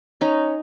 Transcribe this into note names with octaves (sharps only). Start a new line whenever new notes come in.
C#4 D#4